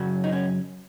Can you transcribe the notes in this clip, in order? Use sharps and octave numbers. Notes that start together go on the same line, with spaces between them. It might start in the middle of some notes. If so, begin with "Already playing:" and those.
Already playing: F#2 C#3 F#3
D#4
C#4